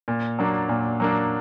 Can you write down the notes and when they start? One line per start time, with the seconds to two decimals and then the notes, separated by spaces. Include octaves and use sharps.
0.08 A#2
0.39 F#3 A#3 D4
0.69 A#2
1.00 F#3 A#3 D4